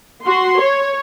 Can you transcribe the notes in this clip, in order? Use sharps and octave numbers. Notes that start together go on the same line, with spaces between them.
F#4 C6
C#5